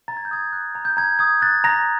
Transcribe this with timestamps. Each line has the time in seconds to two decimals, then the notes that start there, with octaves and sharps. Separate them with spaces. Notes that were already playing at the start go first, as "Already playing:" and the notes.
0.08 A#5 A6
0.17 G#6
0.25 G6
0.31 D#6 G#6
0.52 F#6
0.75 A#5
0.85 G6
0.97 A#5 G#6
1.19 D#6 G#6
1.42 F#6 A6
1.64 A#5 A#6